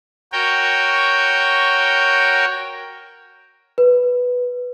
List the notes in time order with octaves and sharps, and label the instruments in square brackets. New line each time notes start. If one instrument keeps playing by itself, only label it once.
[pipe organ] F#4 A#4 C#5 G5
[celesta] B4